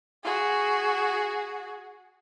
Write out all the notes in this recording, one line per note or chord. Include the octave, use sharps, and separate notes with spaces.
F#4 G#4